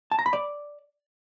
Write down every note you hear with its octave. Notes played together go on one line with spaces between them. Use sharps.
A5
A#5
B5
D5